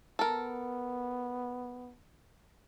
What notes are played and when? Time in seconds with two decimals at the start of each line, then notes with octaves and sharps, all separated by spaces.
0.19 B3 A4 A#4